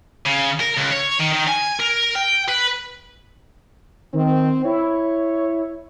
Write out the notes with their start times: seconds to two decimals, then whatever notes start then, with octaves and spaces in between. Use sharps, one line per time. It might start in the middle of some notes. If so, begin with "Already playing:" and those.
0.26 C#3
0.60 A#4
0.77 C#2
0.91 C#5
1.19 D#3
1.32 D#3
1.48 G#5
1.79 A#4
2.15 G5
2.49 B4
4.13 D#3 C4
4.65 E4 C#5